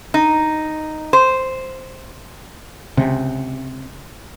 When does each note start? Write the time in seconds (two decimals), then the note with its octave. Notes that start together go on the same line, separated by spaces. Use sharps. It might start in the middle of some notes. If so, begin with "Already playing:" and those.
0.14 D#4
1.13 C5
2.97 C#2 C3